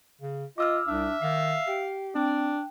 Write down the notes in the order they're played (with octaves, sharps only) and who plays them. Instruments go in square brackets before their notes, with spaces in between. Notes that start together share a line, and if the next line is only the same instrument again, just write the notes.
[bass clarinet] C#3
[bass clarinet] F4 [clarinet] D#5 [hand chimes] D6 E6 F6
[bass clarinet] C2 [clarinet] D4 [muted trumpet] E5
[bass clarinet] D#3 [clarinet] F5
[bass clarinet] G4 [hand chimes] C7
[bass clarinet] C4 [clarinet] D4 [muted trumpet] D5 [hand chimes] G5